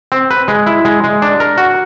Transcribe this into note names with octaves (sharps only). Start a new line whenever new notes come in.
C4
B4
G#3
E4
G#3
G#3
D4
A#4
F#4